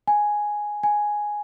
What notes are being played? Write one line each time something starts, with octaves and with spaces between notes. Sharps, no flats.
G#5
G#5